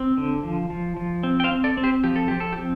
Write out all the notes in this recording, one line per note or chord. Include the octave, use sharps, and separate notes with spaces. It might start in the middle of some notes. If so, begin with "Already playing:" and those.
Already playing: C4
D3
F3
F3
F3
C4
G5
C5 F5
C4
A4 D5
C4
G4 C5
F3 G4
A4
F3 G4
A4
G4
C4